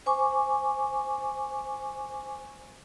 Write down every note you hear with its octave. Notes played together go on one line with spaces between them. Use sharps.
C5 G#5 C#6 D6